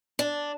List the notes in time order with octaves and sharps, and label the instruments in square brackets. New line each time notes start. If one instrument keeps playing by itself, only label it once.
[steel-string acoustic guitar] D4